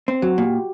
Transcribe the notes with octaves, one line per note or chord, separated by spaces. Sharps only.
C4
F#3 F#4
A#2 G4